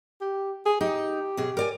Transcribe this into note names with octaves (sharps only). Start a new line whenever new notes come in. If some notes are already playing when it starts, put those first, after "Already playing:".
G4
G#4
D#4 G4
B2 G#4
A#4 D5 G#5